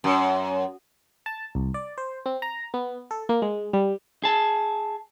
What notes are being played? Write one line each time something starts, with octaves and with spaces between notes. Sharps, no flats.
F#2
A5
C2
D5
C5
C4
A#5
B3
A4
A#3
G#3
G3
G#4 A5